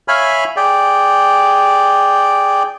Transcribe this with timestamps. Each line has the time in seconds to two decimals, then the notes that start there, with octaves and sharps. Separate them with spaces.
0.08 C#5 E5 F5 G#5 B5 F6
0.57 G#4 D5 G5